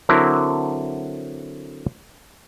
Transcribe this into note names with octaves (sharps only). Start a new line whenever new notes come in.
D3 F#3 C4 E4 A#4